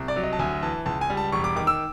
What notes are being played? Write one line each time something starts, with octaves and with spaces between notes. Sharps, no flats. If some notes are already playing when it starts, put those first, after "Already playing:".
Already playing: C2
D5
F#3
D#5
A5
D2 G#5
E3 A5
C#2 A5
G#5
G3
A5
E1 C#6
D6
D#3 D6
E6